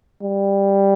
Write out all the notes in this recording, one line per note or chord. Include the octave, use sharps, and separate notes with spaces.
G3